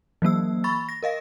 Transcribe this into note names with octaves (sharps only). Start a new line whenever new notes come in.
E3 F#3 A#3 E6
B5 C#6 A6
A#6
A#4 D#5 F5 A#6